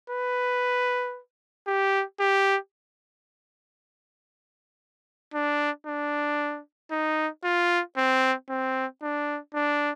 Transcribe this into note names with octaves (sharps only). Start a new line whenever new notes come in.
B4
G4
G4
D4
D4
D#4
F4
C4
C4
D4
D4